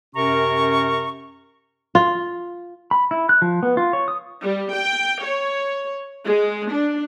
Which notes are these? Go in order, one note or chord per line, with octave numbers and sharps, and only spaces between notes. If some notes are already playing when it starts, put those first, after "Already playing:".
F#2 C3 C#4 A#4 A#5 C#6
F4
B5
E4
F#6
F3
B3
F4
C#5
D#6
G3
G5
C#5
G#3
D4